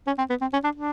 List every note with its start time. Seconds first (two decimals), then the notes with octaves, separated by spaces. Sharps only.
0.07 C#4
0.18 C4
0.30 B3
0.41 C4
0.53 C#4
0.64 D4
0.75 D4